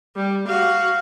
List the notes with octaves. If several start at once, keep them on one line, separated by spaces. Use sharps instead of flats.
G3
F#4 F5